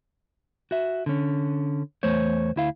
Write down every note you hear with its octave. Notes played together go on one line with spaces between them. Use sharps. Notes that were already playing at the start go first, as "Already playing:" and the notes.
F#4 E5
D3 C#4
E2 A3 C5 C#5
D2 E4 F5